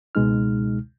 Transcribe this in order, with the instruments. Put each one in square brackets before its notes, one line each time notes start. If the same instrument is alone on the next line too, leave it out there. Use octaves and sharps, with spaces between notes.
[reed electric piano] C#2 B2 G#3 D#4 F6